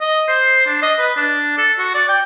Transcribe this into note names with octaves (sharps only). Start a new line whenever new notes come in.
D#5
C5
D4
D#5
B4
D4
A4
F#4
D5
G5